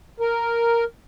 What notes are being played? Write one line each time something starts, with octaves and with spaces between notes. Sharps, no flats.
A#4